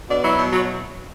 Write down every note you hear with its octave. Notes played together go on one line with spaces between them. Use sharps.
B2 D4
F#3 E4
B2
F#3